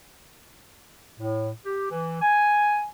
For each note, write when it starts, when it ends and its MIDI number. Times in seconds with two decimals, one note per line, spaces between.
1.19 1.50 45
1.65 1.87 67
1.91 2.18 52
2.22 2.86 80